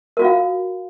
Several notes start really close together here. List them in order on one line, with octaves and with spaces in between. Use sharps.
A#4 F#4 F4 F5